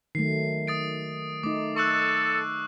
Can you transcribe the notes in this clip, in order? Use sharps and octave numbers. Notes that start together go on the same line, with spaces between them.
D#3 F#3 A3 C7
D#6 A6 D7
A3 D#4 D6
A4 C#6 E6 F#6